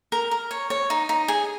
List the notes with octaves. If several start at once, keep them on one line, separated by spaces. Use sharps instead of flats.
A#4
A#4
C#5
C#5
D#4
D#4
G#4